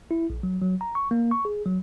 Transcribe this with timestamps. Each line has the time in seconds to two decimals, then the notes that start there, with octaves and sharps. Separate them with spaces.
0.11 E4
0.30 A#1
0.43 F#3
0.62 F#3
0.81 A#5
0.95 C#6
1.11 A#3
1.31 C#6
1.45 G#4
1.66 F#3